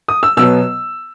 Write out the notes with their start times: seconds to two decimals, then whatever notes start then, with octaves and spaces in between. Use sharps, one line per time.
0.08 D#6
0.23 E6
0.37 B2 F#3 B3 E6